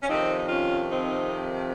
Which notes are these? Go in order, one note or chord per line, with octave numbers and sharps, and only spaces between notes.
C#4
F2 C3 D#3 C4 D#4
D#4
C#4 F4
C4 D#4